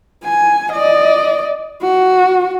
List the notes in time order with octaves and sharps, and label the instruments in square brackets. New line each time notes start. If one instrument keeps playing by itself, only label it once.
[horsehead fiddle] G#5
D5 D#5
F#4